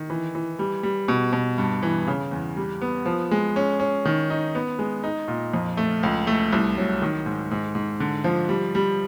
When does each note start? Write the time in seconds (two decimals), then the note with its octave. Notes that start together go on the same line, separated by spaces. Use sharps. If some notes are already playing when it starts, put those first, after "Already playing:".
Already playing: D#3
0.10 E3
0.35 E3
0.59 G3
0.83 G3
1.08 B2
1.33 B2
1.58 G2
1.83 E3
2.07 C#3
2.31 E2
2.57 G3
2.81 B3
3.06 F3
3.31 G#3
3.56 C#4
3.80 C#4
4.05 D#3
4.30 D#4
4.55 B3
4.79 G#3
5.03 D#4
5.28 A#2
5.54 F2
5.77 A3
6.03 C#2
6.27 A3
6.53 C2
6.77 F#3
7.02 D#3
7.26 G#2
7.51 G#2
7.75 G#2
8.00 D3
8.24 F3
8.49 G3
8.75 G3